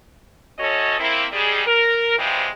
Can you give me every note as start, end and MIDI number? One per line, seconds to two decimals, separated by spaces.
0.58 0.98 38
0.58 0.98 61
0.58 0.98 66
0.58 0.98 69
0.58 0.98 73
0.58 0.98 75
0.99 1.24 58
0.99 1.24 60
0.99 1.24 64
1.32 1.63 44
1.32 1.63 55
1.32 1.63 68
1.66 2.16 70
2.18 2.46 40
2.18 2.46 52
2.18 2.46 53
2.18 2.46 55
2.18 2.46 56
2.18 2.46 60